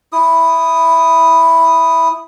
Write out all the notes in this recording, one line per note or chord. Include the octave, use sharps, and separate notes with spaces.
E4 D#6